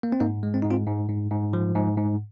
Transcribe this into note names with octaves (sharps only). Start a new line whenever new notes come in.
A#3
C4
G#2 A#3 D#4
G#3
C4
G#2 D#4
C4 F4
G#2
G#2
G#2
F3
G#2
G#2